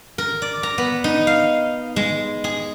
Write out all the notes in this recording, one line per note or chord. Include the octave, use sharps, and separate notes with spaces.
A#4
D5
A#5
B3
D#4
F5
G#3
G#4